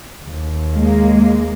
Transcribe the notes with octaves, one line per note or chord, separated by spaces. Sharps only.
D#2
G#3 A#3